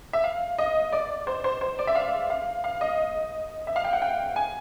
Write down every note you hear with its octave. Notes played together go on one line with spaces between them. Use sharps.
E5
F5
D#5
D5
C5
C5
C5
D5
E5
F5
F5
F5
D#5
E5
F5
G5
F#5
G5
G#5